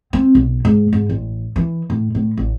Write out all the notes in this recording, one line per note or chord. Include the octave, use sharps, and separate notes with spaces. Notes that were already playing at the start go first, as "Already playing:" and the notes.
C4
B1
G#2
G#2
A1
E3
A2
A2
A1